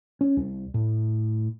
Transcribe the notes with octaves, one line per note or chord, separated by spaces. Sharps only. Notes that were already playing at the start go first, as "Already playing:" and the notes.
C#4
C2
A2